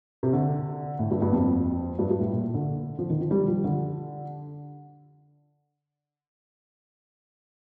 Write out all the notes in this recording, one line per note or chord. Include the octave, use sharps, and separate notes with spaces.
C3
D3
A2
G2
G2
F2
G2
G2
A2
A#2
D3
F3
D#3
F3
G3
F3
D3